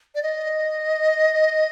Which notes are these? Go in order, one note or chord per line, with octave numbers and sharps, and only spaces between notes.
D5
D#5